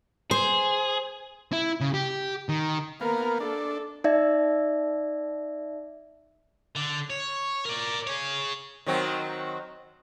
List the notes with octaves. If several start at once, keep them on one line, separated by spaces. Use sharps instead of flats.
G#4 C5
E4
C#3
G4
D#3
A#3 B3 A#4 F5
D4 A4
D#4 D5 E5
D3
C#5
A#4 D5
G#4 C#5
D#3 F#3 C4